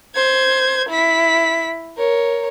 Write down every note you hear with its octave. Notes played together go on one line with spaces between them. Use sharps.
C5 G#6
E4 B6
A#4 C#5